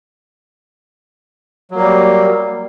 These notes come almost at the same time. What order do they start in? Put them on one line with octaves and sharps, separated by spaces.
F#3 A#3 G3